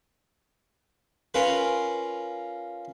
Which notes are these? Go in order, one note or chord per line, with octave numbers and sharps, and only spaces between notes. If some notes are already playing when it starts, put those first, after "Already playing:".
C#4 F4 A#4 B4